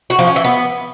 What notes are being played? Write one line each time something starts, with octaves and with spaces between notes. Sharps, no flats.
F#4
F3
C#4
E3
B3